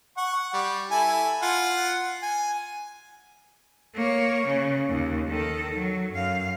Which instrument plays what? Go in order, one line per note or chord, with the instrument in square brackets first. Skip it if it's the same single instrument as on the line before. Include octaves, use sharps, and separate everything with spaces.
[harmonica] F#5 C#6
G3
E4 A4 G#5
F4 F#5
G#5
[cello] A#3 C#5
C#3
D#2
D#3 A4
F#3
F#2 F5